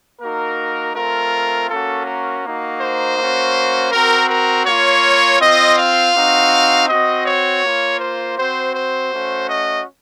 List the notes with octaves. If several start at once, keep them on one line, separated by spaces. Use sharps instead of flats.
A#3 D#4 F#4 A#4
A3 C4 F4 A#4
A#3 C#4 F#4 A4
A#4
A#3 D#4 F#4
C5
A#3 C#4 F#4
C4 F#4 A#4
A#4
A#3 F4 C#5
C4 F4 D#5
F5
C4 D#4 F#4
C4 F#4 D#5
C#5
A#3 F4
C5
C4 F#4 C5
C5
A3 C#4 F#4
D#5